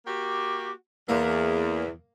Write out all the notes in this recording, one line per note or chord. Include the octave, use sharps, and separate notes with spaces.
A#3 F#4 G4
E2 A#3